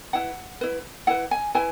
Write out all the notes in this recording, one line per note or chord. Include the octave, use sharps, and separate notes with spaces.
E4 B4 F#5
E4 B4
E4 B4 F#5
G#5
E4 B4 G#5